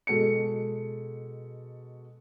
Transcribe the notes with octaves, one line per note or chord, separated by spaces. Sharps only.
B2 G#3 F#4 A4 C#7